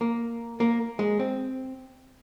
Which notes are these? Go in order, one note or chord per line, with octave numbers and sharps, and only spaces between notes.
A#3
A#3
G#3
C4